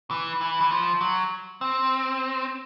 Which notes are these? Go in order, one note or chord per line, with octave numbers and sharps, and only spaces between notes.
E3
E3
E3
F3
F#3
C4